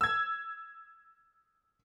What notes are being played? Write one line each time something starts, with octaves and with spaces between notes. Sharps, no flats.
E6 G#6